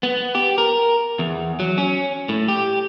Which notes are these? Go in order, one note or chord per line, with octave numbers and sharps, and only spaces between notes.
B3
G4
A#4
E2
F#3
C#4
A2
G4